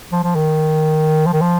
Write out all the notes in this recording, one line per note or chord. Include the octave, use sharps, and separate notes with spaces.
F3
F3
D#3
F3
D#3
F3